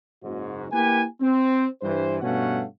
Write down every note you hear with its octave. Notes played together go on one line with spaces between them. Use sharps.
F#1 G#2 F#4
A#3 E4 G4 B4 G#5
C4
G2 E3 C5
G2 B2 A3 C#4 F5 F#5